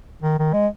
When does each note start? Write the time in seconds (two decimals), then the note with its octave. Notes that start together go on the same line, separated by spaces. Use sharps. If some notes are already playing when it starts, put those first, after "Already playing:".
0.22 D#3
0.39 D#3
0.53 G#3